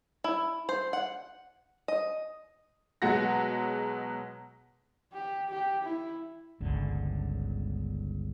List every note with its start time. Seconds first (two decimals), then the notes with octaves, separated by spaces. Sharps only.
0.24 E4
0.69 C5
0.93 F#5
1.88 D#5
3.02 B2 F#3 G#3 F#5 A#6
5.13 G4
5.50 G4
5.84 E4
6.60 G1 C#2 D3